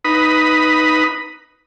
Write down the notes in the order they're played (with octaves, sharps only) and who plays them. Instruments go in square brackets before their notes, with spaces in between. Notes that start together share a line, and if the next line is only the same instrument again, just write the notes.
[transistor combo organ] D#4 B4 B5 D#6